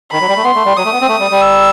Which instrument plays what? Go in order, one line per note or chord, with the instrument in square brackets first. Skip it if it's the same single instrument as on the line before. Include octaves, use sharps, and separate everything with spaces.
[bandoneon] D#3 [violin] B5
[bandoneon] F#3
G3
A3
[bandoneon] B3 [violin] C6
[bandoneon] A3
G3
[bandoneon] F#3 [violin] D#6
[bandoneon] A3
B3
C4
A3
G3
G3
[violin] E6